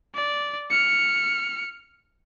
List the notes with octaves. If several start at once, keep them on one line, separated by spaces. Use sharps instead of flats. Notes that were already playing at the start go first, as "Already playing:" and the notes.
D5
F6 C#7